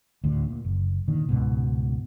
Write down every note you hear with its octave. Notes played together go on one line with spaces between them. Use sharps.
D2 A2 D3
A#2
F#1
A#2 D3 D#3
C#2 G#2 B2